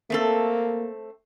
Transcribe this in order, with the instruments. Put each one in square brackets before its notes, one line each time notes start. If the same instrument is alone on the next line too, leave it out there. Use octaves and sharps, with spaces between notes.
[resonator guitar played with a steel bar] A3 C4 A4 [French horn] A#3